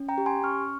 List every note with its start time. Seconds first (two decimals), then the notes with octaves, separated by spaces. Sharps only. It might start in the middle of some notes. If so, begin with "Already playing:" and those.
Already playing: C#4
0.09 G5 A#5
0.18 G4
0.26 G#5 C6
0.43 C#4 C#6 F6